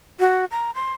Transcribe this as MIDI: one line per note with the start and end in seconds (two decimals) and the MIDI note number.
0.20 0.45 66
0.51 0.71 82
0.75 0.92 84